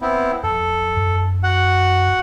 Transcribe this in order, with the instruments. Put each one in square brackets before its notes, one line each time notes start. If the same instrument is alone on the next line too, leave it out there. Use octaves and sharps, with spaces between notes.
[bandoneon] B3 C4 E4
[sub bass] F2 [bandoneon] A4
[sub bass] F#2
[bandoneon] F#4 F#5